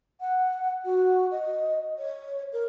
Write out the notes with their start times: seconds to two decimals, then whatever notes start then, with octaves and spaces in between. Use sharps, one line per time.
0.20 F#5
0.85 F#4
1.31 D#5
1.98 C#5
2.52 A#4